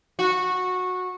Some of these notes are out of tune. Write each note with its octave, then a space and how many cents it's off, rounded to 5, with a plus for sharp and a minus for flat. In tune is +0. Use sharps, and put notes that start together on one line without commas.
F#4 -15